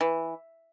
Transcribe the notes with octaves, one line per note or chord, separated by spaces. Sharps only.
E3